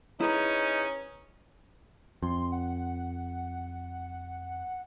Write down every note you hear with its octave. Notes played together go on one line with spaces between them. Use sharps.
C#4 D#4 E4 G#4 B4
F2 C6
F#5